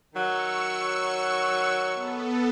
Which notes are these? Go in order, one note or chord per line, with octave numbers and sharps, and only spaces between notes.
D#3 F#3 C#6 E6 C#7
B3 A4